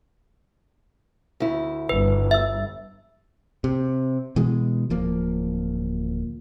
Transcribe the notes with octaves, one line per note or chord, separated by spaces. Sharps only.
D2 E4
G1 B4
E5 E6
C3
B2 E3 G#3
D1 F3 A#3